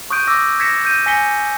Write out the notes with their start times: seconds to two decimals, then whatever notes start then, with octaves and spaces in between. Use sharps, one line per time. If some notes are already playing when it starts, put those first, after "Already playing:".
0.10 C#6 D#6 F#6 G6 D7 D#7
0.27 D6 E6 A#6
0.60 G#6 A#6 B6 C#7 E7
0.85 G6 D#7
1.06 G#5 A#6 B6 C#7 G7